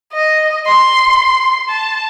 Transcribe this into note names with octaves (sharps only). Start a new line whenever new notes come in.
D#5
C6
C6
A5